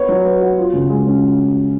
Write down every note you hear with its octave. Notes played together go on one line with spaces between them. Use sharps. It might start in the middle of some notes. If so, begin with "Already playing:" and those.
Already playing: B3 C#5
F#3
B3
F#4
F4
C#3
G#3
C#4